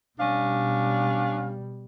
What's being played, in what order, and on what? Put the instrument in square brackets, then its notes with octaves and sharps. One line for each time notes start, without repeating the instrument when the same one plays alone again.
[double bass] B2 G3 [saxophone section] C#4 D4 F5